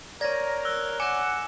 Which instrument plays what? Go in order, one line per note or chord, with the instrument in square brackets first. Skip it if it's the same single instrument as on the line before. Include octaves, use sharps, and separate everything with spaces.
[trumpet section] A#4 [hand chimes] C#5 D5 [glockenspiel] G#6 A#6
[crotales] E6 F#6 G7
[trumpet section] F#5 [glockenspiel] G#5 F#6 [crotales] D6 C#7 E7